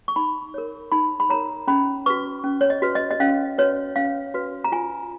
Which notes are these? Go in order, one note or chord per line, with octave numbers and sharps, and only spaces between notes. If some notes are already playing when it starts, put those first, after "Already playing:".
C#6
D#4 B5
A#4 C#5
D#4 B5
B5
A#4 C#5 A#5
C#4 B5
F#4 B4 C#6
C#4
C#5
D#5
F#4 B4
D#5
D#5
C#4 F5
F#4 B4 C#5
C#4 F5
F#4 B4
A#5
F4 G#5